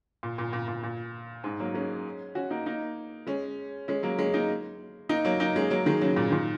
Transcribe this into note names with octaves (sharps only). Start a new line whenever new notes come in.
A#2
A#2
A#2
A#2
A#2
G#2
F#3 A#3
G#3 C#4
C#4 F#4
A#3 D#4
A#3 D#4
G#3 C#4
G#3 C#4
F#3 A#3
G#3 C#4
A#3 D#4
A#3 D#4
F#3 A#3
A#3 D#4
G#3 C#4
F#3 A#3
D#3 G#3
C#3 F#3
A#2
A#2 D#3